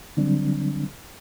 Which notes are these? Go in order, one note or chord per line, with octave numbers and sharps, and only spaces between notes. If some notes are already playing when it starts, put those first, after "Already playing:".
D3 F#3 G3 C4 D4